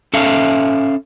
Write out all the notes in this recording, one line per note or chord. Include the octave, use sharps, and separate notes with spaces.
C#4 A4 E5 F5